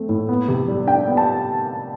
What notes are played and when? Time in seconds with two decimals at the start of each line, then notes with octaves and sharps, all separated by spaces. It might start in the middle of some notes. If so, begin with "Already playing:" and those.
Already playing: A3 C4
0.09 A2
0.29 B3
0.48 C3
0.68 G3
0.87 D4 G5
1.07 B3
1.17 A5